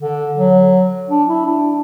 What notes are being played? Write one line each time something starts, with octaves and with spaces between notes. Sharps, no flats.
D3
F#3
D4
E4
D4